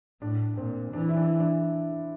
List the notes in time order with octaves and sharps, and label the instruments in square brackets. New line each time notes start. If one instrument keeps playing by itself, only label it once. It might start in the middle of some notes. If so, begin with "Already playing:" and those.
[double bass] A2 [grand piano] D4
[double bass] A#2 [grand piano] C4
[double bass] E3 [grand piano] D4
[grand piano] E4
D4
D4